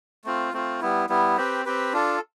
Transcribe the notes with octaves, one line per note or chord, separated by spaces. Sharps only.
A3 C4 F4
A3 C4 F4
G3 B3 E4
G3 B3 E4
C4 G4 B4
C4 G4 B4
D4 F4 A4